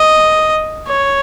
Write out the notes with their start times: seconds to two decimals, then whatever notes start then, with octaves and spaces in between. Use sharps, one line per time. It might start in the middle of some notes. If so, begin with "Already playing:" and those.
Already playing: D#5
0.88 C#5